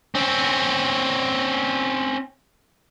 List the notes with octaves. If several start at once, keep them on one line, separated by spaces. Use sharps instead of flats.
C4 C#4